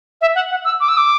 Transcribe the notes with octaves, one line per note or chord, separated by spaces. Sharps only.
E5
F#5
F#5
E6
D6
E6
D6